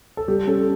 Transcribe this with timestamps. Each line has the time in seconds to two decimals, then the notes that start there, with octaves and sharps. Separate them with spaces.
0.17 A4
0.28 G3 G4
0.47 C#4 A4